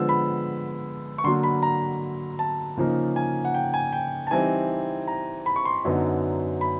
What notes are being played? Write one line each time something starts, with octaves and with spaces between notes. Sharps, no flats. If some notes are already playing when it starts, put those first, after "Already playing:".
Already playing: D3 F3 G#3 B3 E6
B5
C#6
D3 F#3 A#3 C6
B5
A#5
A5
C#3 F3 A#3 D#4
G#5
F#5
G5
G#5
G5
A5
E3 G3 C4 D#4 G#5
A#5
B5
C#6
C6
F#2 D3 F#3 B3 D#4
B5